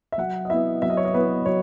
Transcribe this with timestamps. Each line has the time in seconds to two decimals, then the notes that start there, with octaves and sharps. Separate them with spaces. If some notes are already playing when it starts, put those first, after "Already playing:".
0.12 E5
0.18 F#3 F#5
0.45 D#5
0.50 B3 E4 E5
0.82 F#3 E5
0.90 D#5
0.97 C#5
1.05 D#5
1.14 B3 E4 B4
1.46 F#3 C#5